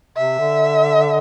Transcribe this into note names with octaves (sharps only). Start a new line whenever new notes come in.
C3 E5
D3